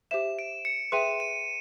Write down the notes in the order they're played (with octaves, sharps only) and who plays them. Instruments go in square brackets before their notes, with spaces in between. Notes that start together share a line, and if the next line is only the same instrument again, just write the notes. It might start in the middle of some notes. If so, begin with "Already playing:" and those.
[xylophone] G4 C5 E5 [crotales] E7
[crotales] D7
C#7
[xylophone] G#4 B4 E5 G5 C6 [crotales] D#7
[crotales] D#7